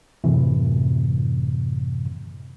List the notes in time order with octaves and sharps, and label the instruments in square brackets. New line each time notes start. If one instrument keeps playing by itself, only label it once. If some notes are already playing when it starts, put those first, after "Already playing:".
[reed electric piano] F#2 A2 C3 E3